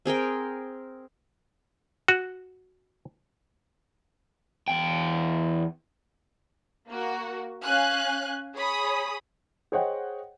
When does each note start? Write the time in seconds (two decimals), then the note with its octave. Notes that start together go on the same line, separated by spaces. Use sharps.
0.06 C4 G#4 A#4 G5
2.08 F#4
4.68 E2 G5
6.89 A#3 F#4
7.63 C#4 F5 G#5 F#6
8.55 G#4 C#5 B5 D#6
9.72 G#4 C5 C#5 D#5 F#5 G5